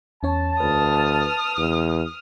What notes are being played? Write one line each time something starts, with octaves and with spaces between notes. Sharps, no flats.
E2 C#4 C#5 A5
D2 B4 D#6 F6
E2